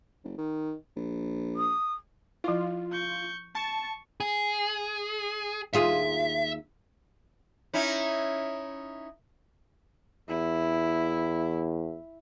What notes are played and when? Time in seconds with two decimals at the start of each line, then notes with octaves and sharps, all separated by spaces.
0.24 F#1
0.38 D#3
0.96 A#1
1.56 D#6
2.44 F3 E4 F4
2.92 C#6 G6
3.55 A5 C#6
4.20 G#4
5.73 D#2 F4 G#4 E5
7.74 C#4 D#4 E4
10.29 E2 E4